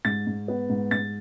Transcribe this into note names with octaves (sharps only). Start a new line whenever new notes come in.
G#2 A6
G#2
B3
G#2
G#2 A6